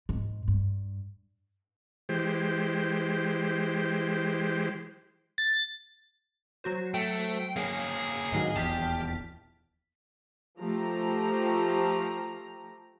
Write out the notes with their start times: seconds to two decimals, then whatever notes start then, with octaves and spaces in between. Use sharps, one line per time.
0.09 G#2
0.48 G2
2.09 E3 G#3 G4 C5
5.38 A6
6.64 F#3 F#4 C5
6.94 A3 G5
7.56 A#3 C#4 G#4 F5
8.32 G#2 D#3 F#3 D#5
8.56 D#1 A#1 E2 G4 A5 F6 B6
10.59 F3 A3 G4 A#5